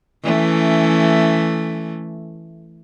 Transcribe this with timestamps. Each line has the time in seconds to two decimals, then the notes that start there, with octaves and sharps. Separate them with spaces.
0.23 E3 A3 C#4